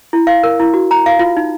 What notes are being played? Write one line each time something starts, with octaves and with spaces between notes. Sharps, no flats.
E4
F5
A#4
E4
F#4
A#5
F5
F4
D#4